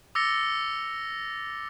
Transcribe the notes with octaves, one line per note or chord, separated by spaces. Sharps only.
D6 E6 A6 A#6 C#7 G7